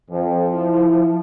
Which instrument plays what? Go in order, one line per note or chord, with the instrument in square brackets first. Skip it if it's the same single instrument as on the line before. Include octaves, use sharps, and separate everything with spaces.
[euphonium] F2 [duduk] F3
[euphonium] E4